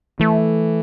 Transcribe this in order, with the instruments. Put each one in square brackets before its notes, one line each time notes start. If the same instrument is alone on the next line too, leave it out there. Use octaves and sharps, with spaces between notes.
[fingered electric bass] E3 [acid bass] A3